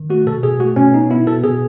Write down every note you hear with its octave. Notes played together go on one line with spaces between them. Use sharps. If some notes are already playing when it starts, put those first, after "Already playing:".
Already playing: D#3
A3 F#4
B2 A4
B2 G#4
A3 F#4
B2 C#4
B3 D#4
B3 E4
B2 A4
B2 G#4